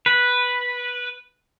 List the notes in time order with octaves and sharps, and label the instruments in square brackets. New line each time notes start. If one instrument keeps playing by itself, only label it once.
[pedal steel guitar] B4